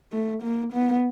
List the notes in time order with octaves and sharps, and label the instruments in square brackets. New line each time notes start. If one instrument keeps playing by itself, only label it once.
[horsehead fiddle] A3
A#3
B3